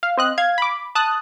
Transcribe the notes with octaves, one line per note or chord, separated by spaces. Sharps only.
F5
C4 D#5 F#6
F5 G#6
B5 D6
A5 D#6 F#6